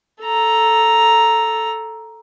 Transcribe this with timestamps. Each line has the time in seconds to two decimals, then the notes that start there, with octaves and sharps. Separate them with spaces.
0.24 A4 A#5